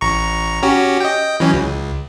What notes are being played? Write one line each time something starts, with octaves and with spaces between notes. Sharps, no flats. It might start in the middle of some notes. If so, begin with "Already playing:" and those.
A1 A#5 C#6
C#4 F#4 G4
D#5 G5
E3 F#3 C#4
C#2